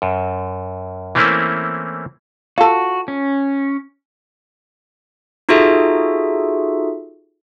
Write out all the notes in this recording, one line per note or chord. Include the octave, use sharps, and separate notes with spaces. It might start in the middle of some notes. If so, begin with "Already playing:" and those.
F#2
E3 A3 A#3 C4 C#4 E4
F4 F#4 A4
C#4
D#4 F4 F#4 G#4 A4 E5